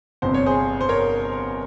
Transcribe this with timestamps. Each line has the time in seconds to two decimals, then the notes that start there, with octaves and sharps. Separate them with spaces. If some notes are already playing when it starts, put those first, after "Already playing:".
0.22 G1 F2 C3 C5
0.34 C#5
0.46 G#4 C5
0.81 C5
0.89 A#4 C#5